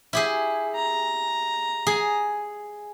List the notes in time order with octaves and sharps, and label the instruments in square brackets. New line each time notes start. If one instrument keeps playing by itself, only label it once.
[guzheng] E4 G4 G#4
[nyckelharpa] A#5
[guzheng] G#4